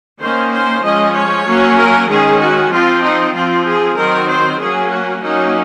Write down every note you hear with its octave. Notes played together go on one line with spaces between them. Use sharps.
D#3 A#3 C#4 C5
C5
F3 G#3 C#4 D#5
C#5
F#3 A#3 C#4
A#4
D#3 G#3 C#4 G#4
F#4
F3 C4 F4
D#4
F3 C4 F4
G#4
D#3 F#3 C4 A#4
C5
F#3 A#3 C#4 G#4
F#4
F#3 A#3 C#4 D#4